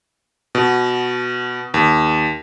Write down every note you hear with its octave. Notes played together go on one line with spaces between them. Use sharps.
B2
D#2